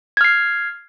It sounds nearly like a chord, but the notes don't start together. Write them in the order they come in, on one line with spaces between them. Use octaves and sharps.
G#6 F6 C7